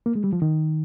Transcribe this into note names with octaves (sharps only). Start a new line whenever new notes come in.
A#3
G#3
G3
F3
D#3